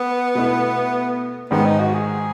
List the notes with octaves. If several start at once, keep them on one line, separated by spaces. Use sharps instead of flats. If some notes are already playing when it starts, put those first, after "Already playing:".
Already playing: B3
B2 A3 E4
G#2 D#3 G#3 B3
D#4
F#4
G#4